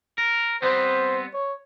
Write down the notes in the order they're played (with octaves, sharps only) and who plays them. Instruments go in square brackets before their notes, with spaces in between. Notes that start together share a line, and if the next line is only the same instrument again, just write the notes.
[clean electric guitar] A#4
[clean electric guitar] G3 B3 C4 [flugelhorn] C5
[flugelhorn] C#5